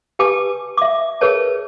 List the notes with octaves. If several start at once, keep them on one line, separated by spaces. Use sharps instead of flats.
G4 B4 G#5 A5 D6
E5 D6
G#4 A#4 B4 C#5 A5